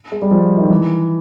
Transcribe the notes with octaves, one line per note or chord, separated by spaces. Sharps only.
G#3
G3
F3
D#3
E3